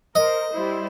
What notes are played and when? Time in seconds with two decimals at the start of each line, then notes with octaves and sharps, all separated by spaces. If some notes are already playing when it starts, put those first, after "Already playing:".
0.15 A#4 C5 D#5
0.51 G3 E4 C5